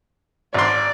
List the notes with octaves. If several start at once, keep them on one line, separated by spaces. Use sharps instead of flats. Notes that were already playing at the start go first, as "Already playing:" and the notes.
G#1 D5 C6